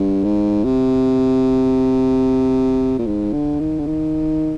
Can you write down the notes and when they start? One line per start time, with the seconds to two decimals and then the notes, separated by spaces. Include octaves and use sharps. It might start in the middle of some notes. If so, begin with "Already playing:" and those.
Already playing: G2
0.24 G#2
0.64 C3
2.99 A#2
3.06 G#2
3.33 D3
3.60 D#3
3.79 D3
3.87 D#3